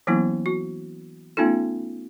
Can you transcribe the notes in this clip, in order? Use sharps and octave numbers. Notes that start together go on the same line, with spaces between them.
E3 F#3 A#3 B3 C#4 E4
F#4
A3 B3 C#4 D#4 F4 A4